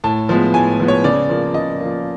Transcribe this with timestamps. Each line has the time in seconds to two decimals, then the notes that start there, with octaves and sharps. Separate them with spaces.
0.04 A2 A5
0.29 F3 G#3 B3
0.54 A2 G#5
0.80 F3 G#3 B3
0.88 C#5
1.04 C#3 D5
1.29 F3 A#3
1.54 C#3 D#5
1.81 F3 A#3